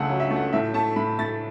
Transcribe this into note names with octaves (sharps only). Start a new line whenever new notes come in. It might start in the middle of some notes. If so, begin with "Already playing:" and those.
Already playing: C#2 C#3 A3 F#5 A5 E6
F#3
E5
A3
F#5
A2 E5
A3 A5
A2 B5
A3 A6